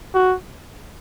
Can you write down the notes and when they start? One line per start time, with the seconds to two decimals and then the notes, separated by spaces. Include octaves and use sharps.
0.14 F#4